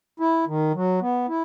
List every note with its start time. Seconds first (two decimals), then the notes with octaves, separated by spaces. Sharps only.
0.20 E4
0.47 D#3
0.74 F#3
1.01 B3
1.28 E4